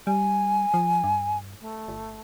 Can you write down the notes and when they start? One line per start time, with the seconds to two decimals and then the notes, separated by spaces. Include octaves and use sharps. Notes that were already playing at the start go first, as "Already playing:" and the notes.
0.07 G3 G#5
0.74 F3
1.04 G2
1.60 A3
1.88 G1